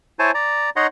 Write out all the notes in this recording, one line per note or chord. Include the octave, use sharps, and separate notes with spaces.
E4 C5 C#5 G#5 A5
D5 A#5
D#4 C#5 D#5 F#5 A#5 C6